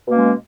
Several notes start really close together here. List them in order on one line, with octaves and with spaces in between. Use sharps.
B2 A#3 C#4 G#3